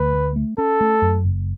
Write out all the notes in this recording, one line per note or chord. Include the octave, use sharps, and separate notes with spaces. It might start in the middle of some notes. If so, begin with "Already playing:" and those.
Already playing: D2 B4
A3
A3
C#4 A4
A3
F#2
F#1